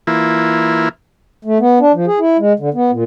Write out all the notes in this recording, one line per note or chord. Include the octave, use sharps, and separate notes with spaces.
E3 A#3 E4 F4
A3
B3
D4
F3
G#4
E4
G#3
D3
B3
A#2